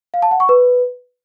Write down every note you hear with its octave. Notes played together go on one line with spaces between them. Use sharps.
F5
A5
F#5
C#6
B4